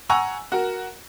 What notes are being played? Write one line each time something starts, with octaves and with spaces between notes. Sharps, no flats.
F#5 G#5 A#5 C#6 E6
F#4 A#4